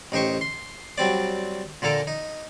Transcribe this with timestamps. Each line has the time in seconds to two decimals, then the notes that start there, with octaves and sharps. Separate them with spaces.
0.12 A1 D#4 G4 C5 C#6
0.41 C6
0.98 F#3 G3 C4 D5
1.82 A#2 D3 A#3 A4 A#5
2.07 D#4